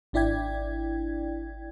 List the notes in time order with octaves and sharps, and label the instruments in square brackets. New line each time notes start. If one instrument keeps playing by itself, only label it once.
[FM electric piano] G#1 D4 E4 D5 G5 G#6